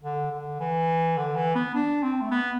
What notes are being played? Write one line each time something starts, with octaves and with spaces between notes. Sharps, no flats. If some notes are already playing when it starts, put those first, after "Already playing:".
D3
D3
E3
D3
E3
B3
D4
C4
A3
B3